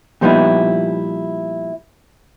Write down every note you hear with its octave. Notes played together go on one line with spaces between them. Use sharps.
A#2 F3 G3 B3 D#4 E4